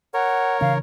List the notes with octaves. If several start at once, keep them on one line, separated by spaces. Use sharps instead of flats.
A#4 C#5 F#5
C#3 E3 D4 F5